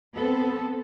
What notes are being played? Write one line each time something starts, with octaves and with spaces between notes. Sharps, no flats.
B3 C4 A4